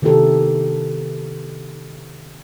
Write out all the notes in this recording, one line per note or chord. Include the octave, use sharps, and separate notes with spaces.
C3 D#3 B3 E4 G4 A4